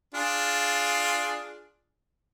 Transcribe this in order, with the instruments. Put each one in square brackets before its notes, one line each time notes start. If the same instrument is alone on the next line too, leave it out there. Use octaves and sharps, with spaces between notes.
[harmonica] D4 F4 G#4